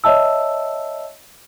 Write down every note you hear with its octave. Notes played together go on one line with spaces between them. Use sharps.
C#5 D#5 E5 A5 E6